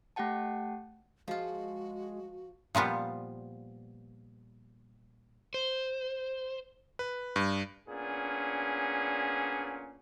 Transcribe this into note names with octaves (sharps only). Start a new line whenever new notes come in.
A3 G4 F#5 G5 A5
F3 G#3 F4 F#4
A#2 F3 G3 B3
C5
B4
G2
A#2 B3 C#4 D4 G#4